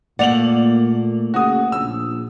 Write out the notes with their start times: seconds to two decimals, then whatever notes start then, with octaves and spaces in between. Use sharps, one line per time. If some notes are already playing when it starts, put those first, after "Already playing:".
0.19 A#2 A3 A#3 D5 F#5 F7 F#7
1.34 C#3 F#4 D#6
1.72 A#1 E6